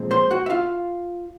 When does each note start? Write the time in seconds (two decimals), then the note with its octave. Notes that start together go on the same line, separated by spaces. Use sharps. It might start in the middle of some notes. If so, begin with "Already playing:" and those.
Already playing: A#2 F3 G#3 C4
0.11 C5 C6
0.31 F#4 F#5
0.46 E5
0.50 F4 F5